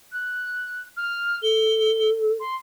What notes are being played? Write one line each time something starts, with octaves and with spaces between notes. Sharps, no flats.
F#6
F6
A4 G7
C6